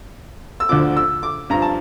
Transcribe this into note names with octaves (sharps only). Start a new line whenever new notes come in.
E6
D2 D3 F3 D6
E6
D6
G2 F3 A#5
A5